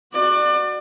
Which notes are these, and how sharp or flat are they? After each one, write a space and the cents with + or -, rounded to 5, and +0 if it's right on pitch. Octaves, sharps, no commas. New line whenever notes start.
F#4 +0 D5 +30